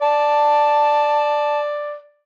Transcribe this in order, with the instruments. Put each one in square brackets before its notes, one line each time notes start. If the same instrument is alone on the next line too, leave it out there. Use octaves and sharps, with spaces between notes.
[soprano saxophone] D5 [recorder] A5